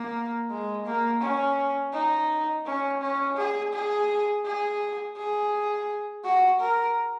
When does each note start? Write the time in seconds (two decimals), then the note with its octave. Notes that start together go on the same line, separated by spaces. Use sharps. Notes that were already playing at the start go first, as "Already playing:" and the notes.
Already playing: A#3
0.50 G#3
0.85 A#3
1.21 C#4
1.93 D#4
2.66 C#4
3.01 C#4
3.37 G#4
3.73 G#4
4.45 G#4
5.17 G#4
6.24 F#4
6.60 A#4